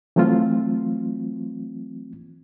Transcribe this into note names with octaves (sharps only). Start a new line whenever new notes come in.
E3 F#3 A3 C4 F4